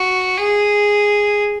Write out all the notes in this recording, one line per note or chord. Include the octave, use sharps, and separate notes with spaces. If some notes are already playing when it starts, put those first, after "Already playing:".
Already playing: F#4
G#4